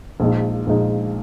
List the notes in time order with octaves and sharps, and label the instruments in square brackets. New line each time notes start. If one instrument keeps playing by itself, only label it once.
[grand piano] A#1 A#2 G#3 D#4
A#1 A#2 G#3 D#4